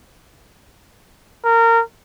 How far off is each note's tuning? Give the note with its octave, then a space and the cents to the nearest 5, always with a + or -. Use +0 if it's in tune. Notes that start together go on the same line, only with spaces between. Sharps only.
A#4 -25